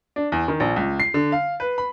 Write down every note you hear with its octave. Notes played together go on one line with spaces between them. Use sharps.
D4
E2
D#3
A#1
C#2
C7
D3
F5
B4
B5